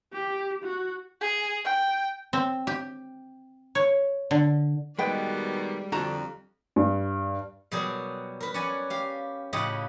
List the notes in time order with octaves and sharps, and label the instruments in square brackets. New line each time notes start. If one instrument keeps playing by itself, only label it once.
[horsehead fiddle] G4
F#4
[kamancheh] G#4
G5
[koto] C4
G4
C#5
D3
[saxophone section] B2 D#3 [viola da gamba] G3 [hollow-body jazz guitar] G#3 [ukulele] B4 G5
[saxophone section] F2 [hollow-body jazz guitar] D3 F#4 A5 [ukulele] A#5
[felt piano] G2
[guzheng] B2 F#3 G3 G#4 A#4
A#4 B4
C#4 D5 F#5 G#5
G4 F5
A2 C#3 F4 G4 D#5 F#5